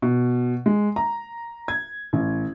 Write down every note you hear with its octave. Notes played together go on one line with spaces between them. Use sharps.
B2
G#3
A#5
G#6
A1